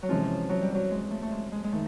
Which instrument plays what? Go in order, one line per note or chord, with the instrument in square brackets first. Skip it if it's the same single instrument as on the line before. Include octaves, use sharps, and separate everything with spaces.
[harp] F#3
[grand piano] C3 E3 G#3 C#4 [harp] F3
[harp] F#3
G3
F#3
G#3
A3
A3
G#3
G#3
G#3
[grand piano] D#3 [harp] A3